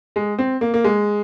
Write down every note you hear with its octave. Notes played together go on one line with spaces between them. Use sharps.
G#3
C4
A#3
A#3
G#3